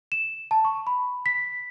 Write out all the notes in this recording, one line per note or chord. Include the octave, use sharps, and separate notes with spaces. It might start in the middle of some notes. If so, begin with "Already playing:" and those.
E7
A5
C#6
B5
B6